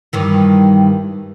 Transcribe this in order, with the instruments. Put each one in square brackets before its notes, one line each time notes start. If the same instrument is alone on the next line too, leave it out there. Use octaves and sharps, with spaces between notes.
[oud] G2 D#3 E3